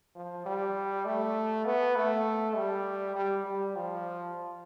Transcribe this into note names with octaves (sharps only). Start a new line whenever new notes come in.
F3
G3
A3
B3
A3
G3
G3
G3
F3